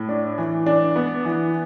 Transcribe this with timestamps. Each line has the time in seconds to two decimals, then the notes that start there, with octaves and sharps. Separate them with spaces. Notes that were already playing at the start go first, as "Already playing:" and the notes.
Already playing: A2
0.09 D4
0.38 E3
0.66 D4
0.96 B3
1.25 E3